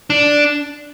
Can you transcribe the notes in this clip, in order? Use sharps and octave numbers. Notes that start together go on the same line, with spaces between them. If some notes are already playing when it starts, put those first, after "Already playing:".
D4